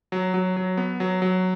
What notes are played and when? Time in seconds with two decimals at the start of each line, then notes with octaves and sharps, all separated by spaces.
0.12 F#3
0.34 F#3
0.57 F#3
0.77 B3
1.00 F#3
1.22 F#3